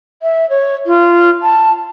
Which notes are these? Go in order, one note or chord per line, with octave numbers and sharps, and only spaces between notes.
E5
C#5
F4
A5